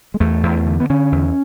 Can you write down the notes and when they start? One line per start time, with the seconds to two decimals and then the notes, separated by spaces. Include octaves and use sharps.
0.14 G#3
0.20 E2 A3
0.43 E2
0.66 D3
0.80 B3
0.90 D3 C#4
1.12 E2